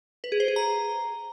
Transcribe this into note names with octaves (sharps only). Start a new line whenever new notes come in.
B4
G#4
C5
G#4
A#5